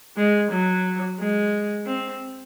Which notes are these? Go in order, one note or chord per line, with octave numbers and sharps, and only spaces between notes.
G#3
F#3
G#3
C4